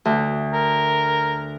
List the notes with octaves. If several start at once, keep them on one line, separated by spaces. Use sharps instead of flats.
D2
A#4